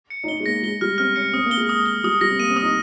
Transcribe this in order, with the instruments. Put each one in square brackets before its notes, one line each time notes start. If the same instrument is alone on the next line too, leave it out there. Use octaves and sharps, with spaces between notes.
[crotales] C#7
[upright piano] D#4
[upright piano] C#4 [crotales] G7
[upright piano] G#3
[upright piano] A#3 [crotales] A#6
[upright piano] G#3 [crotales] G7
[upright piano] G3 [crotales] F6
[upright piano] C4 [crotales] F6
[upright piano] C#4 [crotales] C#7
[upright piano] C4 [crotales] D#6
[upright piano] A#3
[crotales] G7
[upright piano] G#3
[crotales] D#6
G7
[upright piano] G3 [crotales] D#6
[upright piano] G3 [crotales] A#6
[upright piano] C4
[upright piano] A#3 [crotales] D#7
[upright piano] C4
[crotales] D#6
[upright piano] D#4